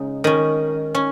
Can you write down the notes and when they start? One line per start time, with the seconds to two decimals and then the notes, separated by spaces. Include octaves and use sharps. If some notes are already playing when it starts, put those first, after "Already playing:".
Already playing: C#3 G#3 D#4
0.24 D#3 C#4
0.95 C#4